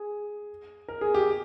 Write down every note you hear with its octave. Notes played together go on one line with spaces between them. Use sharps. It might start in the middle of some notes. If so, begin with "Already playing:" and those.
Already playing: G#4
A#4
G#4
G4